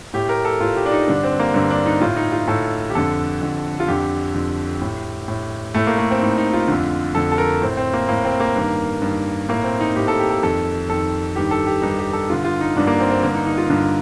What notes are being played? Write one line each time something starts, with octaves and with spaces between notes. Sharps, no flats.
A2 G4
A#4
A4
A2 F4
G4
D4
D#4
G2 D3 D4
C4
A#3
G2 D3 C4
D4
D#4
A2 F4
D#4
F4
A2 A4
G4
F2 D3 A4
F2 D3
F4
F2 D3 G4
F2 D3
A2
A2
A2 A3
A#3
A3
C4
A2 D#4
D#4
F4
F2 D3
F2 D3 A4
A4
A#4
A2 C4
C4
A#3
A2 A#3
C4
A#3
G2 D#3
G2 D#3
A2 A#3
C4
D#4
A2 G4
A4
G4
A4
F2 D#3 A4
F2 D#3 A4
G2 D#3 G4
A4
G4
G2 D#3 D#4
G4
A4
G2 D3 F4
F4
D#4
G2 D3 D4
A#3
C4
C4
G2 D3 A#3
D#4
D#4
F4
G2 D3